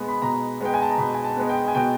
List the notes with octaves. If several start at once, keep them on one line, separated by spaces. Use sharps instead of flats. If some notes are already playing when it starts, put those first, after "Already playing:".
Already playing: B2 G#3 B3
B5
B2 A#5
G#3 B3 G5
G#5
A5
A#5
B2 B5
G#5
A5
G#3 B3
G5
G#5
B2 G5